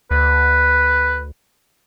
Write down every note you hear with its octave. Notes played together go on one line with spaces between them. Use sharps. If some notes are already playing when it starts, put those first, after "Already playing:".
D2 B4